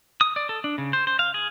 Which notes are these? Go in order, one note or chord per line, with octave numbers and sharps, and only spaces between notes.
D#6
D5
A4
D4
C#3
C5
C5
F5
G#4